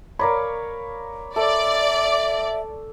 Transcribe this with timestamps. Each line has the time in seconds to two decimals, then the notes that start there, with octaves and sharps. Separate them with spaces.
0.19 A#4 C#5 D5 F5 A#5 B5
1.36 A4 D5 E5